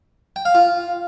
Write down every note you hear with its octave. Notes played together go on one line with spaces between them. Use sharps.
G5
F5
F4